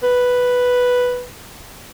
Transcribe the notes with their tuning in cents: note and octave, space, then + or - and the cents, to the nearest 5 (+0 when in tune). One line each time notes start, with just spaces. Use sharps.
B4 +0